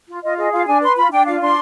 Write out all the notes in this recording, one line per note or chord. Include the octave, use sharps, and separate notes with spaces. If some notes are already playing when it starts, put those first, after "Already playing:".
F4
F4 D#5
G#4 D#5
F4 F5
D4 G#5
B4 C6
F4 B5
D4 G5
F4 F5
D4 C6